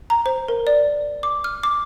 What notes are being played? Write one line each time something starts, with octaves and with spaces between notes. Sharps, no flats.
A#5
C5
A#4
D5
D6
F6
D6